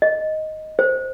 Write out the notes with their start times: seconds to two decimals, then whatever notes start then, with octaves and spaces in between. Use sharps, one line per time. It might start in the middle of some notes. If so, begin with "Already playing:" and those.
0.02 D#5
0.79 C5